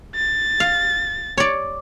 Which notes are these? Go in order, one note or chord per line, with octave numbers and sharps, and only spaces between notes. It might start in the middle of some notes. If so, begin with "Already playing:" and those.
A6
F5
C#5 D5